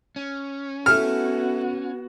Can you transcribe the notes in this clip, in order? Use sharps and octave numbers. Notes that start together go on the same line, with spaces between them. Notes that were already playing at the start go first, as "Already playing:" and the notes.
C#4
A3 B3 E4 F#4 A4 F6